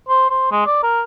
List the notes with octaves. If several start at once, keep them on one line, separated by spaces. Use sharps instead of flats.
C5
C5
G#3
D5
A#4